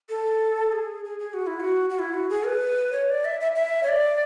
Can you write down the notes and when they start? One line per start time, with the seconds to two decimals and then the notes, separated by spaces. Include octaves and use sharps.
0.09 A4
0.72 G#4
1.04 G#4
1.19 G#4
1.34 F#4
1.47 E4
1.60 F#4
1.90 F#4
1.99 E4
2.14 F#4
2.30 G#4
2.46 B4
2.93 C#5
3.10 D5
3.25 E5
3.41 E5
3.56 E5
3.83 C#5
3.88 D5